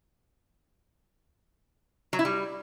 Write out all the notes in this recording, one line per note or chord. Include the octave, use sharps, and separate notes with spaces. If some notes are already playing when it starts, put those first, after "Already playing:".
F#3
E4
G3